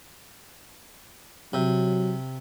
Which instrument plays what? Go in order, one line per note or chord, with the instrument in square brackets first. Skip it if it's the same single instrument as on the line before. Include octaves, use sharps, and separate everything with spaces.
[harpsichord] C3 [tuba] F#3